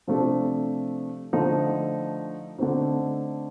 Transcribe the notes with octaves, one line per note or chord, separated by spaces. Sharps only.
C3 F3 A3 D4
D3 F3 A3 D#4
D3 A3 C4 D#4